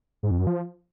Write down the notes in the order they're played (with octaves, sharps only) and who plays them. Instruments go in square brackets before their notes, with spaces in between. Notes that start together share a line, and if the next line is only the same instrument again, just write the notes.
[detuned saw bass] G#2
F2
F#2
F3